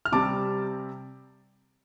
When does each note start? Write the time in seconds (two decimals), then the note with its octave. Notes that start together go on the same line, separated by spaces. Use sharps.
0.05 F6
0.12 C3 G3 C4 A5 D6